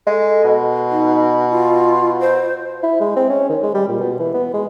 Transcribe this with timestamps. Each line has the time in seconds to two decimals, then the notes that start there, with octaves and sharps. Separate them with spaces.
0.07 G#3 A4
0.44 B2
0.90 D#4
1.49 F4
2.20 C5
2.83 E4
3.00 G#3
3.17 C4
3.29 C#4
3.49 D#3
3.63 G#3
3.74 G3
3.88 A#2
4.00 B2
4.20 E3
4.34 B3
4.54 G#3